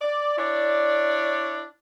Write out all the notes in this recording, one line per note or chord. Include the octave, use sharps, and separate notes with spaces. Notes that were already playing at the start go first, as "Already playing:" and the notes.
D5
D4 E4 C#5 D5